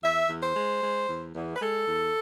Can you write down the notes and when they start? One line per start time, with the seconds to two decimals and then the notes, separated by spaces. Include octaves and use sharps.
0.03 E2 E5
0.29 E2
0.43 C5
0.56 G#3
0.83 G#3
1.09 E2
1.35 E2
1.56 B4
1.62 G#3 A4
1.88 E2